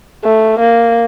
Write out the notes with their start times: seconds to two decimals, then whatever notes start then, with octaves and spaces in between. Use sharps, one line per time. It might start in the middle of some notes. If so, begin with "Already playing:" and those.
0.25 A3
0.60 A#3